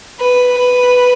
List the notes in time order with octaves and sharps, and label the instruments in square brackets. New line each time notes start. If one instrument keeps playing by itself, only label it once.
[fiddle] B4
B4